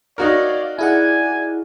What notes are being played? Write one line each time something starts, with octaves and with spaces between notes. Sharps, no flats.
D#4 F#4 A#4 C#5 D5 F5
E4 G#4 D5 F#5 G#5